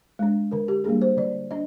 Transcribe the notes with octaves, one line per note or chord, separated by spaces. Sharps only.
G#3 D4
D3 A#4
G4
G3 A#3 D4 G#4
C5
D3 D5
D4 D#5